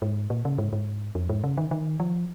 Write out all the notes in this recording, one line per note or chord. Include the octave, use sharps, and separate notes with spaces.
G#2
A#2
C#3
G#2
G#2
F2
G#2
C#3
D#3
D#3
F3